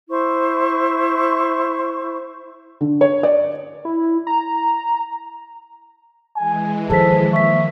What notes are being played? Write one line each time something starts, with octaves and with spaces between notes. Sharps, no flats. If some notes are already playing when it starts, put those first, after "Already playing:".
E4 C5 C#6
D3
C#5
D5
E4
A#5
E3 G#3 G#5
D#3 F3 G#4 A4 C5 B6
A#3 E5 C#6 B6